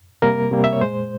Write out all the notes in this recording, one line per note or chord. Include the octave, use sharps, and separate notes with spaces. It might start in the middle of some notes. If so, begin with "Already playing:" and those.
C3 G3 A#3 A#4
C3 G3 A#3
E5
C#5
A#2 G#3 C5